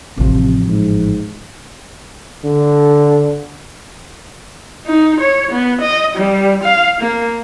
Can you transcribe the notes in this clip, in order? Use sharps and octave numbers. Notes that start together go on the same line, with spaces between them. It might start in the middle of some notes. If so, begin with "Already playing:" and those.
A1 C3 F3
G#2
D3
D#4
C#5
B3
D#5
G3
F5
A#3